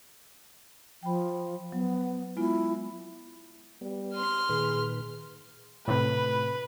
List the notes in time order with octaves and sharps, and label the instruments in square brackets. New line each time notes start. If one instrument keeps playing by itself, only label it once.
[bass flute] F3 [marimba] G5 B5
[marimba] F#3 [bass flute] B3
[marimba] G#3 B3 F4 [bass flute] E4
[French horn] G3 [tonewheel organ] B3
[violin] C6 F6
[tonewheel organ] A#2 D#3 B4 [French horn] G#4
[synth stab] A2 C3 [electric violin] B4